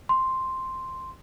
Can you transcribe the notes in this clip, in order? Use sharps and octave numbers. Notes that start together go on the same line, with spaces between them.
C6